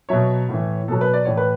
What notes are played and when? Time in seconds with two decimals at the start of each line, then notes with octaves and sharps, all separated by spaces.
0.09 B2 F#3 C#5 E5
0.49 A2 E3
0.88 B2 F#3 A4
1.01 B4
1.13 D5
1.25 A2 E3 C#5
1.37 B4